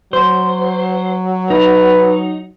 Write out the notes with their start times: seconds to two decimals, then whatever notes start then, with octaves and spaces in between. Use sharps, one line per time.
0.13 F#3 C5
1.50 D#4 B4